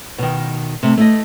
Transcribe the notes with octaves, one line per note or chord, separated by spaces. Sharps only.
B2 D#3
C3 A3
A3 E4 D#5